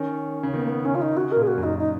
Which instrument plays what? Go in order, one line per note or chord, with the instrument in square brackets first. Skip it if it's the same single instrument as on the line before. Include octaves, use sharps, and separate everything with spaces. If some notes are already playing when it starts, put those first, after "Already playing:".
Already playing: [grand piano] D#3 [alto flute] C#4
[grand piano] C#3
[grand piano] D#3 [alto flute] B3
[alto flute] A#3
B3
[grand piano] C#3 [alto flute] C#4
[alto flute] F4
D#4
[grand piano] C#3 [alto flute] F#4
[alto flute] A#4
[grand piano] A#2 [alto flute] G#4
[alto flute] F#4
[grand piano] F#2
[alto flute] D#4
D#4